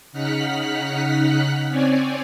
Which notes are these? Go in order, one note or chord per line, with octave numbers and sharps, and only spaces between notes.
C#3 D#4 F#5 F6 F#6 B6
C4 C#5 D5 G#5